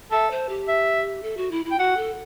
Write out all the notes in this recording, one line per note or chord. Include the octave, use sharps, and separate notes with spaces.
A4 E5
C5
G4
E5
A4
F#4
E4
E4
G5
F#4 F#5
A4